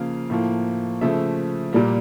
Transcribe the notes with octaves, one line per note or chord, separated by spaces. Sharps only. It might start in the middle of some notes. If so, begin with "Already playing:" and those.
Already playing: C#3 F3 A#3 F5
A2 F3 A#3
C#3 F3 A3 E5
A#2 G3 A#3